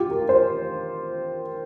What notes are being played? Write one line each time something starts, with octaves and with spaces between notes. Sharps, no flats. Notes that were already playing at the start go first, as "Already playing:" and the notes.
Already playing: F4 G4
A#4
C5